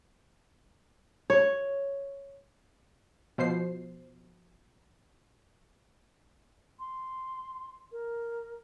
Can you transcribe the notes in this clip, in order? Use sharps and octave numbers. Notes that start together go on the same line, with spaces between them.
C#5
B2 F3 C5 C7
C6
A#4